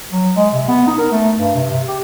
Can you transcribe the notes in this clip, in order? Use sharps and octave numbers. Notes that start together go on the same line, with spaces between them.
F#3
G#3
C3
B3
D#4
A#4
A3
G2
C3
C3
G4